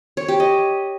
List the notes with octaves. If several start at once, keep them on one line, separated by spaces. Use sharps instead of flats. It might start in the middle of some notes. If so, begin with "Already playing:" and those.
C#5
G4
D#5